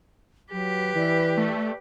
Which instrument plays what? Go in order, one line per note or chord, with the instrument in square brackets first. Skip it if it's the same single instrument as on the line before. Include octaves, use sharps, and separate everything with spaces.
[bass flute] F#3 [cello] G4 B4
[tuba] E3 [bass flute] D5
[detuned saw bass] A3